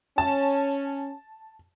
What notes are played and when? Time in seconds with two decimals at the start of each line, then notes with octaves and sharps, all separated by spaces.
0.18 C#4 A5